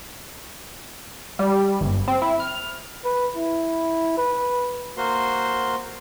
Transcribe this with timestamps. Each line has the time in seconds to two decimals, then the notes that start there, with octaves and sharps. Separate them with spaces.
1.39 G3
1.81 G1
2.08 C4
2.22 E4
2.40 F6
3.04 B4
3.36 E4
4.18 B4
4.97 A#3 F#4 C5 C6